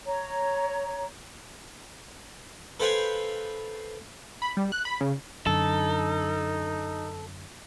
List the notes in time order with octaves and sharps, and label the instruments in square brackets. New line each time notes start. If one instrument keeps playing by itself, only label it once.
[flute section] C#5 A#5
[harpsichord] A4 B4 C5 F5 G5 G#5
[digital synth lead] B5
G3
F#6
B5
C#3
[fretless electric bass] F#2 D3 [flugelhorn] D#4 [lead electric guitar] A4